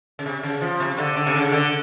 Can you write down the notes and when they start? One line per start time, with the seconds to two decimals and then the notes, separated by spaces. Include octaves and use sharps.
0.19 C#3
0.26 C3
0.43 C#3
0.62 F3
0.80 C3
0.98 D3
1.17 D3
1.26 C3
1.34 C#3
1.52 D3